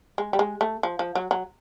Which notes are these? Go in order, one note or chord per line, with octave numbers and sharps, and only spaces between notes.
G#3
G3
G#3
A3
F3
F3
F#3
F#3